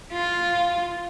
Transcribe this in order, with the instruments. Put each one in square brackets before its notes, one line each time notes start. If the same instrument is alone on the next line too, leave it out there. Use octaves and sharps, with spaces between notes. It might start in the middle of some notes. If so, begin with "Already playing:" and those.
[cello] F4